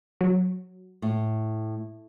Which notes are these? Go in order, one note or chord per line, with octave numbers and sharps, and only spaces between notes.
F#3
A2